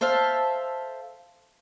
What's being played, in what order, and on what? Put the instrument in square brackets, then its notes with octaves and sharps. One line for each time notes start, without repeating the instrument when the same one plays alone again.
[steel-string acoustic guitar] A4 C5 E5 F5 A5